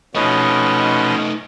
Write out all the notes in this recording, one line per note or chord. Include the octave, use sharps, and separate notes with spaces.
B2 F3 A3 C#4 D#4 B4 D#5